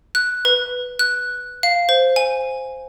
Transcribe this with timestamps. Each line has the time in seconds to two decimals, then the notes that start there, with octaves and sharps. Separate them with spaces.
0.15 F#6
0.45 B4
0.99 F#6
1.63 F5
1.89 C5
2.16 G#5